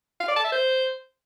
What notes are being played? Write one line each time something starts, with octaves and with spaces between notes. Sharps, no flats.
F5
D5
A5
E5
C5